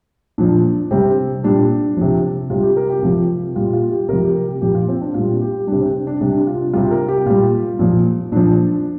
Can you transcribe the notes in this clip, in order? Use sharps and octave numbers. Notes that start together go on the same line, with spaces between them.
A#2 F3 D4
C3 G3 C4
A#2 G3 D4
C3 F3
C3 G3 F4
G4
A#4
G4
C3 F3 F4
A#2 G3 F4
F4
G4
C3 F3 A#4
G4
A#4
G4
A#2 F3 G4
F4
C4
D4
A#2 G3 F4
G4
C3 G3 D4
C4
D4
C3 G3 D4
F4
C3 G3 F4
A#4
G4
A#2 G3 F4
A#2 F3
A#2 F3 D4